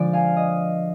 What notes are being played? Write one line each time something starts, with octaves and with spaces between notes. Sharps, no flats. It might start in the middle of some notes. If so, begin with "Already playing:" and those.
Already playing: D3 F3 G#3 D5
F5 G#5
D#5